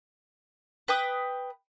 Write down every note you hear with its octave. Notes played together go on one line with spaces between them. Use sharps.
B4 G5 D#6